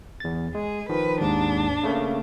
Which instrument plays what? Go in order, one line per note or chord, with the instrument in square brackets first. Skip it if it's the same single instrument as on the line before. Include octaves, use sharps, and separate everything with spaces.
[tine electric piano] E2 A6
[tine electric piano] G#3 [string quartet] G#4
[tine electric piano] D#3 F3 [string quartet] B4
[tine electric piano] D#2 G#2 [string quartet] D4
[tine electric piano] C#3 A3 A#3